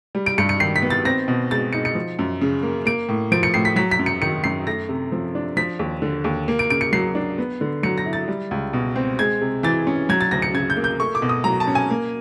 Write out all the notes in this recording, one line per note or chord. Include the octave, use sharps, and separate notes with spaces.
G3
D7
G2 C#7
C#7
D#3 C7
B6
B3
A6
C4 A#6
B2
G#3 A6
D#4 C#7
C#7
F3
F#2
C#3
A#3
A#3 D7
A2
F3 D7
C#7
A2 C7
B6
F#3 B6
B6
F#2
C#7
D#3 C#7
F#2 C7
A3 A#6
C3
F3
D4
F3 B6
D#2
D3
D#2
A#3
D7
C#3 D7
C#7
F#3 C7
D4
B3
D3
F#3 C#7
A#6
E4
A6
G3
C#2
B2
C4
G#3 G#6
C3
E3 A6
C#4
F#3 G#6
A6
D2 A#6
C#7
C#3 G#6
G6
A#3
G6
A3 C#6
D6
B2
D#6
F#3 A#5
A5
C#4
G#5
A#3